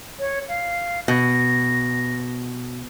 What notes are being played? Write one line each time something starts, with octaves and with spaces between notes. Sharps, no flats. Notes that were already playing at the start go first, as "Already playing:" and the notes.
C#5
F5
B2 A#6